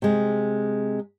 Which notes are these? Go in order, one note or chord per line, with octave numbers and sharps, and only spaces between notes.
C3 G#3